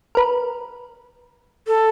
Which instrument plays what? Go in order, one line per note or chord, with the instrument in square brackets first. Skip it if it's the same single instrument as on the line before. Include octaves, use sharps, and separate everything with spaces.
[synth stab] A#4 B4
[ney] A4